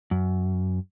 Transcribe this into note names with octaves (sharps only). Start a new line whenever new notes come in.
F#2